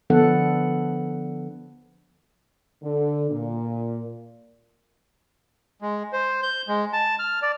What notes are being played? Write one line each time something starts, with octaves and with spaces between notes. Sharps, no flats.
D3 F3 B3 D4 A4 F#5
D3
A#2
G#3
C5
G6
G#3
A5
F6
D5